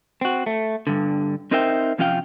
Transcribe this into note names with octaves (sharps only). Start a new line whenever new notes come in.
C4 F#4
A3
G2 D3
C4 D#4 A#4 C5 E5 G5
C3 F3 C#4 F4 F5 G5